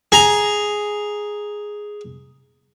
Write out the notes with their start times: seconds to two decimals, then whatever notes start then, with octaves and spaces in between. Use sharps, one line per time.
0.12 G#4 A#5